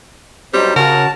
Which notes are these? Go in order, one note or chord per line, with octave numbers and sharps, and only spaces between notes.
C3 F#3 G3 D#4 C5
C#3 F#4 A#4 A5